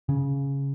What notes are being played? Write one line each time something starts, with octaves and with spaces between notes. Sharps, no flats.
C#3